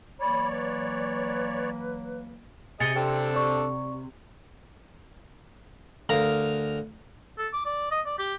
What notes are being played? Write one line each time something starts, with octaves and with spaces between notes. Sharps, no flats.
E3 F#3 A#3 C#5 D5 B5
B4
C3 G#4 D#5 G#5 A6 C#7 G7
C4 D4 A4 G5
D5 C#6
D2 A#4 F5 A#5
A4
D6
D5
D#5
D5
G4